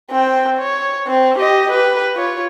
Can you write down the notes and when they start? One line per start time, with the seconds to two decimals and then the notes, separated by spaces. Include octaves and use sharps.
0.11 C4 G5
0.58 C#5
1.08 C4
1.39 G4 D#5
1.72 G4 B4
2.16 F4 C#5